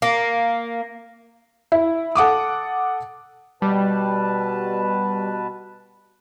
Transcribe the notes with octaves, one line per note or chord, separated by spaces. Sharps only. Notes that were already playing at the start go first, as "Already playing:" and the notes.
A#3
E4
A4 F#5 D6 D#6
B2 G3 B4 A5